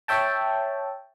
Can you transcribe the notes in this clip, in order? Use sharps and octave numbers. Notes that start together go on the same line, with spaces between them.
C#5 E5 G5 A5